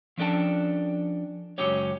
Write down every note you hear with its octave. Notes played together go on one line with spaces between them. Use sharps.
F3 C#4 D4 A4 G5 A5
C#2 F#2 F#3 C#4 G4 C#5